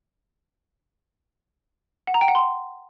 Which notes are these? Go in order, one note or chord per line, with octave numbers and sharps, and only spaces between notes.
F#5
A#5
G5
F#5
C6